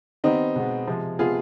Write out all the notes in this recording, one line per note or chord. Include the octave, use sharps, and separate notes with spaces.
D#3 G3 B3 C4 D#4
B2 G#3 B3
C3 F3 G#3
C3 F3 G#3 B3 F4 G#4